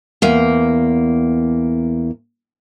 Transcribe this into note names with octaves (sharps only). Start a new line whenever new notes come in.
E2 A#3